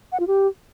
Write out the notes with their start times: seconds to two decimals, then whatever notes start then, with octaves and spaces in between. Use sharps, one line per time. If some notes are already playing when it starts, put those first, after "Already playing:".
0.12 F#5
0.20 F4
0.27 G4